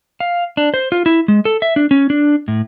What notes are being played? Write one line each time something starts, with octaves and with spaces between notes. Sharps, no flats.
F5
D4
C5
F4
E4
G#3
A4
E5
D4
C#4
D4
A2